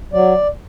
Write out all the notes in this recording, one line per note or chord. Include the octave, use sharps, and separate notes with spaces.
F#3 D5